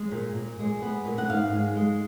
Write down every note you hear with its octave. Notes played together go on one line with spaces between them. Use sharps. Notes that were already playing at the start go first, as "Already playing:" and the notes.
Already playing: G#3
A#2
A#2
G#3
B3
A#2
F#5
G#2 F5
G#3
G#3